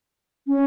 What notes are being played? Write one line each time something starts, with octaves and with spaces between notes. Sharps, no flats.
C#4